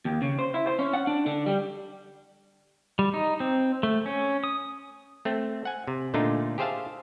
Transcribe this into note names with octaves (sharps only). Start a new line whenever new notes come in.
D#2
C#3
C5
E4
C5
C#4
F#5
D4
D3
G3
G3
D#4
C4
A3
C#4
D#6
A3 C4
F#5 G#5
C3
A#2 D3 A3 D4 D#4 F4
G4 G#4 C5 E5 F5 A5